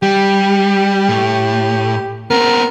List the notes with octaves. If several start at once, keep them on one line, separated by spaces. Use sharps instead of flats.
G3 G4
A2
B3 C4 A#4